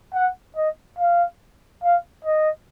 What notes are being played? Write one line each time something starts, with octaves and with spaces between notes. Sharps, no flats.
F#5
D#5
F5
F5
D#5